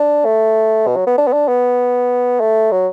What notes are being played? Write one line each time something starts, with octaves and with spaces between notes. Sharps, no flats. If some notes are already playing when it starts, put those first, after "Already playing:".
Already playing: D4
A3
B2
F#3
B3
D4
B3
D4
B3
A3
F#3